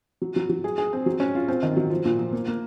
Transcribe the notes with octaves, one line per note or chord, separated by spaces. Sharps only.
F#3
F#3
F#3
G#4
G#4
C4
F#3
C#4
F4
C4
D#3
F#3
F3
A#2
F3
A#3
A#3